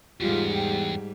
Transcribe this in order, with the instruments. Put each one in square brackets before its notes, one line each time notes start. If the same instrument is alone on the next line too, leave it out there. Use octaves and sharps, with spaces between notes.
[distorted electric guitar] E2 [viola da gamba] G#2 G3 [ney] F4
[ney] G5